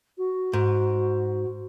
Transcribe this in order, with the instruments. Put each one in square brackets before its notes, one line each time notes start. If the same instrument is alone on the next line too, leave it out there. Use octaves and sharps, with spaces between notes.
[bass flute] F#4
[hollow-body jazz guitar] G#2